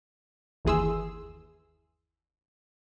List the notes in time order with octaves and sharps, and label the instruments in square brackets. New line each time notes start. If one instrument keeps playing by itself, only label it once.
[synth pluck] G1 D#2 E3 G#4 C6 E6